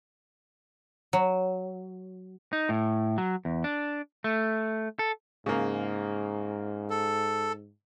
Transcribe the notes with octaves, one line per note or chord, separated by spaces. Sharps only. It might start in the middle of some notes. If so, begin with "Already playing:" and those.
F#3
D#4
A2
F#3
E2
D4
A3
A4
G#2 C#3 A#3
A4